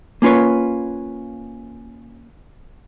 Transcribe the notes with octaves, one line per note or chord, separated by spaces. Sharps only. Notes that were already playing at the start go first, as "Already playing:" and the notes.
A#3 C#4 F4 B4 C#5